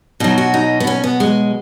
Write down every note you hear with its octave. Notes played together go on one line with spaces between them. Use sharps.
B2 F#3 D#4
F#4
D#4
B3
C#4
B3
G#3